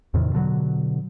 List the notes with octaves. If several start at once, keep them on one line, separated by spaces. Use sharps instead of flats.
E2 A2 C3 D#3
B2 D3 F#3